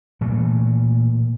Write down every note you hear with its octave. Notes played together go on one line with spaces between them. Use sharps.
A#2 E3 A3